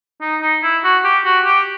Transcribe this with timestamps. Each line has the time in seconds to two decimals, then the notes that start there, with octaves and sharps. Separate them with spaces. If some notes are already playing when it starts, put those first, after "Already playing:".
0.21 D#4
0.42 D#4
0.63 E4
0.84 F#4
1.04 G4
1.25 F#4
1.45 G4